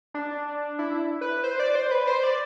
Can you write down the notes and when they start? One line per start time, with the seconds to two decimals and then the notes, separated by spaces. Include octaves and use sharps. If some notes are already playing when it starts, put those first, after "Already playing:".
0.14 D4
0.79 E4
1.21 B4
1.44 C5
1.60 D5
1.75 C5
1.91 B4
2.07 C5
2.24 D5